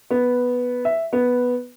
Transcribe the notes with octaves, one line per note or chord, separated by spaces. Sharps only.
B3
E5
B3